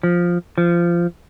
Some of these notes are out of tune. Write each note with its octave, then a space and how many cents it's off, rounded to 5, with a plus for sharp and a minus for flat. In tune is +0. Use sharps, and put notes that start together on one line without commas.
F3 +5
F3 -20